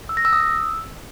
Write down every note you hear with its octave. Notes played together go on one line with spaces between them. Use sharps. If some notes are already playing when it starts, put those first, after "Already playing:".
E6
A#6
E6
D#6
E6